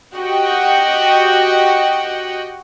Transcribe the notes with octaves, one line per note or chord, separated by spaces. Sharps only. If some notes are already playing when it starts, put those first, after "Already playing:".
F#4 G4 D#5 F#5 G5